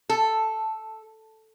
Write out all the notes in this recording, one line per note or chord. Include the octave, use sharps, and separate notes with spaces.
A4